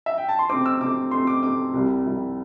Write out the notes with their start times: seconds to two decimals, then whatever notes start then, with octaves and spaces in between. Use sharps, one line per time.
0.06 E5
0.18 G5
0.29 A5
0.39 C6
0.49 C3 A3 C4 D6
0.66 E6
0.81 C3 A3 C4 D6
1.11 C3 A3 C4 C6
1.27 D6
1.43 C3 A3 C4 D6
1.74 C2 C3 G3 E4
2.05 C2 C3 G3 E4